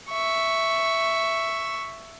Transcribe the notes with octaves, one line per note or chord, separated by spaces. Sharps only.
E5 C#6